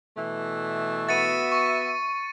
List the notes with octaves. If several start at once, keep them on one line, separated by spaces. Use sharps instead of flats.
B2 E3 A3
B3 F#4 E5 A6 C#7 D#7
C#6